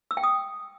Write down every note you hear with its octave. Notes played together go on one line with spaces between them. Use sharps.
E6
G5
D#6